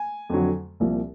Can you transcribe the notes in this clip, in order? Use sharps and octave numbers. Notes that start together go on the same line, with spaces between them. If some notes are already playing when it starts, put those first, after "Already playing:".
Already playing: G#5
F2 D3 F#3
C2 A#2 F3